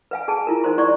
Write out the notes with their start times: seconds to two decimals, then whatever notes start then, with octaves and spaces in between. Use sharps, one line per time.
0.11 B4 F5 G#5
0.28 G#4 G#5 A5
0.47 E4 F4 A#4
0.64 D#4 A#4 C5 C6
0.78 E4 C#5 D5 C6 C#6